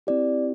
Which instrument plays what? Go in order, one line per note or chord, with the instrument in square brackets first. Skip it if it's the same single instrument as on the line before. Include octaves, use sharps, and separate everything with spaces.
[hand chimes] C4 E4 G4 D5